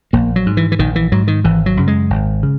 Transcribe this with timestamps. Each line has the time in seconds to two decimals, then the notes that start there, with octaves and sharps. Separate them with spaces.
0.13 A#1 A#3
0.36 F#3
0.46 G#2
0.57 E3
0.72 E3
0.79 A#1 D#3
0.96 E3
1.12 G#2 F#3
1.28 D#3
1.44 G#1 E3
1.66 F#3
1.77 F#2 C#3
1.88 G#3
2.10 G#1
2.43 C#3